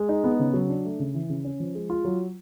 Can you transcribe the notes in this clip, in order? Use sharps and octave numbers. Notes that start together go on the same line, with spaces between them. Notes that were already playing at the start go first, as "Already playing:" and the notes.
Already playing: G#3
D#4
B3
C#3
F#3
D4
A3
C#3
E3
C#3
C#4
F3
G#3
F4
F#3